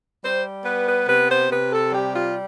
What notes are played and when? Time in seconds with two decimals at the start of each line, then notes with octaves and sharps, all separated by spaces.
0.23 G3 C5
0.65 B3 B4
0.86 B4
1.08 C3 B4
1.30 C5
1.50 C3 B4
1.72 A4
1.92 G3 G4
2.15 F4